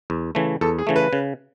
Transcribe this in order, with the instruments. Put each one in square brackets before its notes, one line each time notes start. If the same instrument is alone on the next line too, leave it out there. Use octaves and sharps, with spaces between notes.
[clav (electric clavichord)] E2
C#3 E3 A3
[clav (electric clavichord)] E2 [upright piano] A4
[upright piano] G#4
[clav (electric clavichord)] C#3 E3 A3
[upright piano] B4
[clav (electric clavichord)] C#3